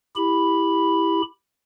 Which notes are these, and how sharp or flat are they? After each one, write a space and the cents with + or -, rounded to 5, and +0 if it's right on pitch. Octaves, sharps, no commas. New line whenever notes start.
E4 +0 G4 +10 B5 +0